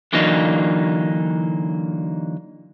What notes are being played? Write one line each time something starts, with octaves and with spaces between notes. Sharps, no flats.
D3 E3 F#3 A#3 D4 D#4